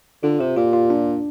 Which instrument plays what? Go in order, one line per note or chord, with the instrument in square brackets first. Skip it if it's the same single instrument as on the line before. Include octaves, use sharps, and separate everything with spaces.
[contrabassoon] D3 [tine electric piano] F4
[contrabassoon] C3 [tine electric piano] G4
[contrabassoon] A#2 [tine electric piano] F4
[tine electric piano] F4
D4